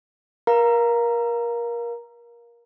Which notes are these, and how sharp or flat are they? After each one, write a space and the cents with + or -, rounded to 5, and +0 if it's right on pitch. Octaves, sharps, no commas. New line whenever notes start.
A#4 +25 F5 +0 A#5 +0